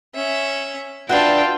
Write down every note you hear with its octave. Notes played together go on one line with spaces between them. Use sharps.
C#4 E5
D4 F4 F#4 B4 E5 G5 A5